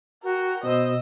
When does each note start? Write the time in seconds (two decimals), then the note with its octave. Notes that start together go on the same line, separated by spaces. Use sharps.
0.23 F#4 A#4 G5
0.63 B2 C5 D#5 E6